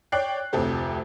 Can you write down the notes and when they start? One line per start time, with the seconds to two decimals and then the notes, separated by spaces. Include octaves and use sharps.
0.12 C#5 D5 G5 F#6 C7
0.53 F1 D2 C3 G4 A4